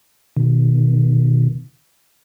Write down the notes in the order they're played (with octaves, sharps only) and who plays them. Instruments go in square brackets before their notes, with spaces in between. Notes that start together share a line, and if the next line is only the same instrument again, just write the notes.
[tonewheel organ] B2 D#3